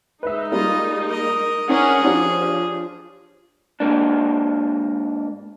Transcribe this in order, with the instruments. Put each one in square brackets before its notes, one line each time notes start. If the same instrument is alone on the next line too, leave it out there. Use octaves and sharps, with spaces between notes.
[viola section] G#3 D#4 [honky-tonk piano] B4 E5
[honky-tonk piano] G3 A#3 [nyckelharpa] F4 D#5
[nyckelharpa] A#4 D#5
[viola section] C#4 A#4 F#5 [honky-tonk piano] D4 [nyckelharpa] G#4
[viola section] F3 [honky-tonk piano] D4 G4 C#5
[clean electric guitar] G#2 A#3 D4